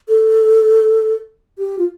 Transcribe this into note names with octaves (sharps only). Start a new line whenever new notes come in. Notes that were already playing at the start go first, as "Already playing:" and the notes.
A4
G4
F4